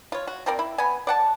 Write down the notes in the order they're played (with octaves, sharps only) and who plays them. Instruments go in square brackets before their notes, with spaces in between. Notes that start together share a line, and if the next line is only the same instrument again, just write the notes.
[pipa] F4 C#5
F#4
F3 C4 A#4 D5
E4
B3 G#5
D5 F#5 A5